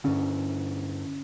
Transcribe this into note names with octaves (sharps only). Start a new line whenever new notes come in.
G2 D3 C#4